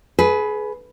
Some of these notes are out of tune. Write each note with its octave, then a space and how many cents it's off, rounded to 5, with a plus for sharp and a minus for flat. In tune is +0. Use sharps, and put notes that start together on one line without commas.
G#4 +30 B4 +0